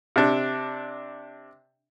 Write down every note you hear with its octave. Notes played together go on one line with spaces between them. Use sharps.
C3 D4